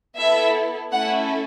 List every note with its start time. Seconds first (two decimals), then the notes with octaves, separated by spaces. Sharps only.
0.18 B3 E4 A4 E5
0.92 A3 C#4 E4 A4 F#5